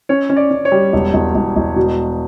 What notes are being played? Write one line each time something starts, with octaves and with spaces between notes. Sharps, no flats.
C#4 C#5
C#4
D5
C#4
C#5
G3
E1
E1
E1
E1
B2